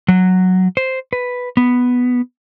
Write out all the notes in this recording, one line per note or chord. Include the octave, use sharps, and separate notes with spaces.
F#3
C5
B4
B3